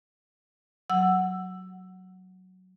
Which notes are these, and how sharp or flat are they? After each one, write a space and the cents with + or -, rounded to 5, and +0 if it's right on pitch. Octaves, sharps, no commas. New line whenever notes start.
F#3 +0 F#5 +0 E6 +10